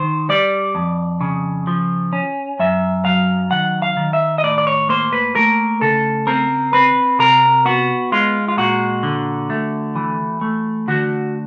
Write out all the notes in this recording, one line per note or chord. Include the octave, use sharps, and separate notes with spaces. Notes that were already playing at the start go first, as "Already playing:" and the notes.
Already playing: D#3 C5
G3 D5
F2
C#3
F3
C#4
F#2 E5
F#3 F5
D#3 F#5
F5
D#3
E5
D#5
A2 D5
D5
C#5
A#3 C5
B4
A3 A#4
C#3 A4
C4 A#4
C4 B4
C3 A#4
B3 F#4
G#3 F4
F4
A#2 F#4
D3
A3
E3
A3
D3 F#4